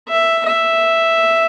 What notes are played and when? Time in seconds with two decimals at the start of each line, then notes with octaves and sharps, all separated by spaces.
0.09 E5
0.46 E5